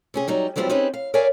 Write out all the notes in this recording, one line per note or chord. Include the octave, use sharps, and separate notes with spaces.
C3 C#4 G#4
F#3 G3 D#4
E3 F#3 G3 C4 E4 F4
C4 C#4 D#4 G4 G#4 B4
F5
A#4 C#5 D5 E5 F5 G#5